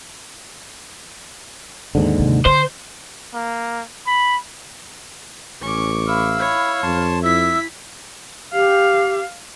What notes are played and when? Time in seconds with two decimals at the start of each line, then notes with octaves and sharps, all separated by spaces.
1.95 D#2 G#2 D3
2.19 C3
2.46 D3 C5
3.34 A#3
4.07 B5
5.62 A1 C#4 C#6 D6
6.08 E4 F5 B5 E6 F6
6.39 C#5
6.83 F2 A5 C6
7.23 E4 E5 E6 B6
8.53 G4 F5